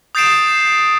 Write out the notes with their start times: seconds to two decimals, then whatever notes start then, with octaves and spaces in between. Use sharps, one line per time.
0.15 D#6 G6 A6 C7 D7 E7